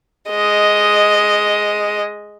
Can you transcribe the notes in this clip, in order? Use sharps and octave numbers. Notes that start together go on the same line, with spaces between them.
G#3 D#5